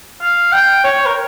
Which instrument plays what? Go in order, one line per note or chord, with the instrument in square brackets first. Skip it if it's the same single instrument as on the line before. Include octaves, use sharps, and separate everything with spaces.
[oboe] F5
G5
C#5
A#4